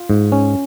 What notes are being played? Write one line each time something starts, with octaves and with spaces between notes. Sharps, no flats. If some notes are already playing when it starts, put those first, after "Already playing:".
Already playing: F4
G#2
C#4